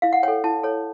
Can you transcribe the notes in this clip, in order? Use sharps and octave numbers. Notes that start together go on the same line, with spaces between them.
E4 F5
F#5
A4 C#5 G5
E4 A5
A4 C#5